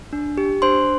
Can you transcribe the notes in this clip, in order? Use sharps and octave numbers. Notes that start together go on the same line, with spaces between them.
D4
G4
D4 C5 C6